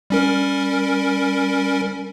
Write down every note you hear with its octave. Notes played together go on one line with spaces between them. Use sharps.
G3 C#4 A#4